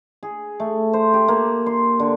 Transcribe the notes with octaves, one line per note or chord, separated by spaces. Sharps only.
G#4
A3
C5
G4
A#3
C6
D3